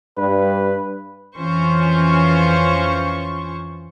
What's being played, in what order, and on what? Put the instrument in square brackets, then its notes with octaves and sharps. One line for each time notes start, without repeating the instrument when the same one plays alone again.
[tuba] G2 [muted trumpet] B4
[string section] F2 E3 C#4 F4 C5 C#6